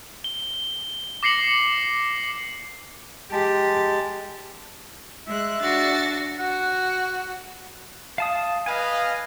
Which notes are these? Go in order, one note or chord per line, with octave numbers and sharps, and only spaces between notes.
G7
D6 A#6 C7 C#7 F#7
G#3 G4 A5
G#3 E5 F#6
D4 F#4 A6
F#4 F#5
F5 A5 D#6
B4 D#5 F5 G#5